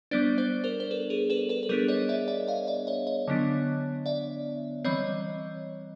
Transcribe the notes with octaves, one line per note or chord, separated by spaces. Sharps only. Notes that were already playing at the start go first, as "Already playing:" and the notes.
G3 B3 D4 C5 D5
C5 D5
A#4 C5
C5
A4 B4
G#4 A#4
A4 B4
A4 B4
B4
G3 B3 D4 G#4 A#4
C#5 D#5
D5 E5
D5 E5
D#5 F5
D5 E5
C#5 D#5
C#5 D#5
D3 F#3 B3 D4
D5 E5
E3 G3 C4 C#5 D#5